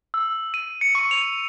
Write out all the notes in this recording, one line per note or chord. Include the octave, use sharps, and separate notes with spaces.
E6
D#7
C#7
C#6
F7